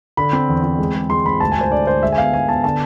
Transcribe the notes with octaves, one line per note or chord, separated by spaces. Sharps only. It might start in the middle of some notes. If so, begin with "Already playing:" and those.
D3 B5
C4
E2
C4
G#3
G#3
G#3 C6
G#2 B5
D2 A5
D2 G#5
C5
D3 D5
D3 C5
G#3 E5
G#5
B3 F5
G#2 G#5
B3 A5
D3 A5